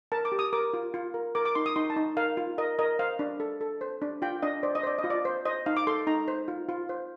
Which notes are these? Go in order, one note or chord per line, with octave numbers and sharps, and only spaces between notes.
A#4 A5
D6
G4
D#6
A#4 D6
F4
F4
A#4
A#4 D6
D6
D#4 C6
D#6
D#4 C6
A5
D#4
A#4 F5
F4
A#4 D#5
A#4 D#5
C5 F5
D4
A4
A4
C5
D4
F4 G5
D4 D#5
C5 D5
D#5
C5 D5
D#5
F4
D5
C5
C5 D#5
D#4 F5
D6
A4 C6
D#4 A#5
C5
F4
F4
C5